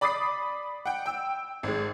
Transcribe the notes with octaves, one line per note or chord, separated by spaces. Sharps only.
D5 B5 D6 D#6 A6 C7
F#5 G5
G5 E6
G#1 G#3